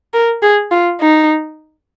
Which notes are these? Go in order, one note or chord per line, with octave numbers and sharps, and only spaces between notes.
A#4
G#4
F4
D#4